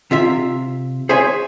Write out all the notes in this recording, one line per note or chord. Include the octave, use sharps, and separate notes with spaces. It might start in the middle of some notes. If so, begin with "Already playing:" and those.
C3 F4 E5
G#4 C5 C#5 E5 G#5